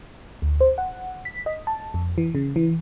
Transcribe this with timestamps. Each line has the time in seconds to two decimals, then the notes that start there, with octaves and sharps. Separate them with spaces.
0.42 D2
0.61 C5
0.78 F#5
1.25 B6
1.46 D#5
1.67 A5
1.94 F2
2.18 E3
2.35 C#3
2.56 E3